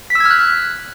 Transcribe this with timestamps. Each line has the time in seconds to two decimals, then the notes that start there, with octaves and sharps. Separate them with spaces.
0.10 B6
0.15 E6
0.20 G#6
0.25 F6
0.30 F#6